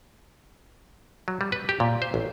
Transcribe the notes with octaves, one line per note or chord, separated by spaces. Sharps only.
F#3
G3
B4
G4
A#2
C5
A1